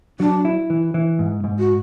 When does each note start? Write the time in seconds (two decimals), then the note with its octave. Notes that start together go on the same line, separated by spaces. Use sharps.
0.20 F#3 D4
0.45 E4
0.70 E3
0.94 E3
1.19 G#2
1.44 G#2
1.59 F#4